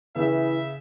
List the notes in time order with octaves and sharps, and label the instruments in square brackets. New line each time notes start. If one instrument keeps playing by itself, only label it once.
[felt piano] C#3 [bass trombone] E3 [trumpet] E5